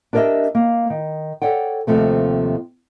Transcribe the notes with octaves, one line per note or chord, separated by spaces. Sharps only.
D4 G4 A#4 C#5 D#5 E5
A#3
D#3
A4 B4 C#5 D5 F#5 G5
D#2 C3 F3 A3 C4